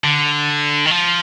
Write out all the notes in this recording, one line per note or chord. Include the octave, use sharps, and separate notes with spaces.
D3
D#3
F3